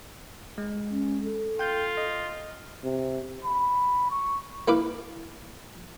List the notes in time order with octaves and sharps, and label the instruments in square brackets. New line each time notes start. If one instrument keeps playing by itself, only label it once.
[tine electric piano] G#3
[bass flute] C#4
A4
[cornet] F4 [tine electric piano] G5 G6
[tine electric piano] D#5
[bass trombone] C3
[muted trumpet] B5
C#6
[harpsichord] A#3 E4 B4 F5 D6